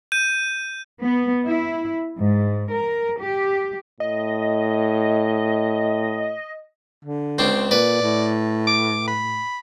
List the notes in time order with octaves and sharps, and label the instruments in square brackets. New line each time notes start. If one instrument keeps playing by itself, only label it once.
[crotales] G6 D#7
[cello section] B3
E4
G#2
A#4
G4
[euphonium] A2 [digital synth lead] D#5
[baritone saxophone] D3
[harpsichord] C#2 C4 D4 [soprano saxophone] C5
[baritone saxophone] A#2 [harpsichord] B4 [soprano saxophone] D5
[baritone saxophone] A2
[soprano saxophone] D6
B5